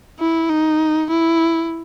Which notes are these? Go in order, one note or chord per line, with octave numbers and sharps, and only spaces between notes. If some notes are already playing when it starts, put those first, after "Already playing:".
E4
D#4
E4